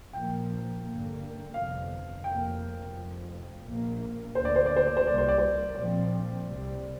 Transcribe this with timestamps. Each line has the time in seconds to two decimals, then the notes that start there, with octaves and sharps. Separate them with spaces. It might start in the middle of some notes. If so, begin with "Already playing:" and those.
0.13 A#1 A#2 F3 A#3 G5
0.84 G2 D3 A#3
1.54 G1 F2 C3 F5
2.24 F1 F2 C3 A#3 G5
2.95 F1 F2 F3
3.65 A#1 A#2 A#3
4.35 D2 D3 A#3 C5
4.45 D5
4.56 C5
4.66 D5
4.77 C5
4.87 D5
4.97 C5
5.05 C2 C3 G3 A#3 D5
5.18 C5
5.28 D5
5.38 C5
5.75 A#1 A#2 F3 C4 D5
6.46 C2 C3 G3 C4